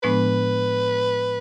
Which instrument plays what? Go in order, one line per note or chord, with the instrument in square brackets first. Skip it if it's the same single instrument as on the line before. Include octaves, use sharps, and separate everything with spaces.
[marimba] A2 F3 G#3 B3 D4 [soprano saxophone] B4